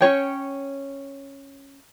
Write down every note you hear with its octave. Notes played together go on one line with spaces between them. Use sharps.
C#4 F4 C#5 G5